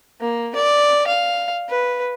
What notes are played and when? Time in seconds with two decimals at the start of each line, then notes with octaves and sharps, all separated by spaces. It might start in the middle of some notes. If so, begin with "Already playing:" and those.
0.20 A#3
0.55 D5
1.07 F5
1.69 B4